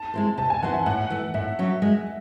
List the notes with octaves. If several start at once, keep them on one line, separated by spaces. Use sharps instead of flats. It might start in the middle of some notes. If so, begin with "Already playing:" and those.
Already playing: A5
G#3 C4 E4 C5
C3 A5
G#5
E3 C4 E4 C5 F#5
E5
A2 F#5
E3 A3
A2 E5
F#3 C#4
G#3